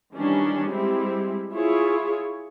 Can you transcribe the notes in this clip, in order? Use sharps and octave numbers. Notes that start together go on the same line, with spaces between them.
D#3 E3 G3 C#4 D4
G3 G#3 C4 E4 G4
E4 F4 G#4 C#5